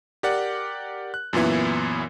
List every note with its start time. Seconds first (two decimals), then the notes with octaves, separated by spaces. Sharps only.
0.23 G4 A#4 D5 F#5
1.14 F#6
1.33 F#2 A#2 E3 B3 E4